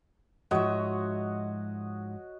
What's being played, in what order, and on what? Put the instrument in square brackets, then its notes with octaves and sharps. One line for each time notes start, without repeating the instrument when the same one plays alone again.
[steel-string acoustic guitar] G#2 F3 E5 [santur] F#4 C#5 D#5